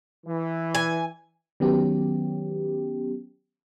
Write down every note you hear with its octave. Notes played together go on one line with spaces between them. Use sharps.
E3
G#5
D#3 F#3 B3 C#4 G4